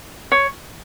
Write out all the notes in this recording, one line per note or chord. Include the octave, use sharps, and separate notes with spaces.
C#5